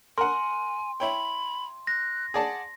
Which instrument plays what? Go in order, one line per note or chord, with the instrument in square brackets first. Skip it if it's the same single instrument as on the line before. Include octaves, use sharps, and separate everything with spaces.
[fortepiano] A#4 F#5 [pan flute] G#5 [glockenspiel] C6
[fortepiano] E4 C#5 G5 [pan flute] B5
[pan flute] F#6 [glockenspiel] A#6
[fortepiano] G#4 D5 A5 [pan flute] F#5